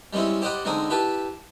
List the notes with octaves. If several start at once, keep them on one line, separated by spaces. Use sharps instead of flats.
G3 G#3 C4 C#4 E4
G4 C5 D5 D#5 F#5 B5
D3 G#3 C4 D4 D#4
E4 G4 B4 A5